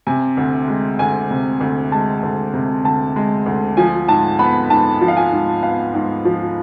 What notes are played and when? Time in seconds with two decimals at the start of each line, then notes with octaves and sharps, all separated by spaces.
0.07 C3 G#5
0.37 D2
0.68 G#3
0.99 D2 G#5
1.31 C3
1.61 D2
1.92 G#3 A5
2.23 D2
2.54 C3
2.84 D2 A5
3.16 G#3
3.46 D2
3.77 F3 G#5
4.08 G#2 A5
4.39 B3 B5
4.70 G#2 A5
5.01 F3
5.08 F5
5.17 G#5
5.32 G#2
5.63 B3 F5
5.94 G#2
6.25 F3